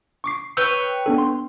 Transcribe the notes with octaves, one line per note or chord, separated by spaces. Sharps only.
C#6 D6 C7
B4 C#5 G5 E6 G6
B3 D4 A4
C6